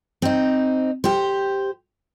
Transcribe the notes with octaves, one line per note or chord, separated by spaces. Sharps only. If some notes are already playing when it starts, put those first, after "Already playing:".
C4 D#4
G4 C5